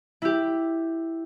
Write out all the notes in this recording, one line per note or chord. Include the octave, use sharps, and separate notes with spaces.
E4 G4